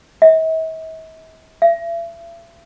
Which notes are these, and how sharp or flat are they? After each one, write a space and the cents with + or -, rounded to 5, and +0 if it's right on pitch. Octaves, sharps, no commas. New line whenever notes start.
E5 -45
E5 +35